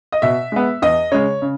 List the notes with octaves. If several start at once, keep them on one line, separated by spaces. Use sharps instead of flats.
D#5
B2 E5
G#3 B3
E2 D#5
C#3 G#3 C#5
C#3